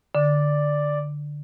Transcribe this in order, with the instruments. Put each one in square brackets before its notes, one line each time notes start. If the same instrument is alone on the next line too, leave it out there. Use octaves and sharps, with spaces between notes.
[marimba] D3 [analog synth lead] D5